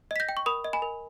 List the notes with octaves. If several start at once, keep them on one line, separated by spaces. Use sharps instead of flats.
D#5 B6
G6 A#6
G5
C#6
A#4 B5 D#6
D#5
G#5 B5
A#4